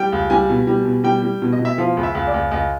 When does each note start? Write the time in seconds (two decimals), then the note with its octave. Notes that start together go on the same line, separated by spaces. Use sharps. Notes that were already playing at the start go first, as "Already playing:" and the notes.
Already playing: G3 G5
0.13 C#2
0.30 G3 G#5
0.49 B2
0.67 G3
0.85 B2
1.04 G3 G5
1.22 G3
1.42 B2
1.53 D#5
1.59 B2
1.65 E5
1.78 F3 F5
1.97 C#2
2.03 E5
2.15 C#2
2.27 D5
2.34 C#2
2.51 C#2 D#5